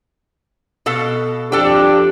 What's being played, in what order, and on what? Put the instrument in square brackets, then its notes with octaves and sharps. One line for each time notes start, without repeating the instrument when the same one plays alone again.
[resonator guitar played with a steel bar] B2 A4 F5
[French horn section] F2 G4 [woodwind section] D4 [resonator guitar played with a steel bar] A4 G5